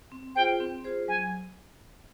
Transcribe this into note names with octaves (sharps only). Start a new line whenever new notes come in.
C4
F4 G#4 C5 G5
C4
F4 G#4 C5
F#3 G#5